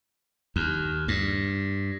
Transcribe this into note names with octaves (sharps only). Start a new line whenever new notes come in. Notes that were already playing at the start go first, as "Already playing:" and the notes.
D#2
G2